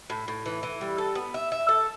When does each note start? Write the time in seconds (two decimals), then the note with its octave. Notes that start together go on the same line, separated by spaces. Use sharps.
0.10 A2
0.28 A2
0.46 E3
0.63 E3
0.81 G3
0.98 A4
1.15 B3
1.34 E5
1.52 E5
1.69 A4